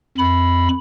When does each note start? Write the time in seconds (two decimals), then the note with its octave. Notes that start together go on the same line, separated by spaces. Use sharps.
0.18 F2 B5